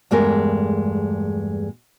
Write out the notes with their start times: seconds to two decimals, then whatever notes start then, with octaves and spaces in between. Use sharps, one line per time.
0.11 E2 G2 G#3 A3 A#4